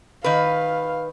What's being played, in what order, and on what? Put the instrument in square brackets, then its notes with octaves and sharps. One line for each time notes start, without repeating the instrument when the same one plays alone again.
[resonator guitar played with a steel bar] D#3 B4 [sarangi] F5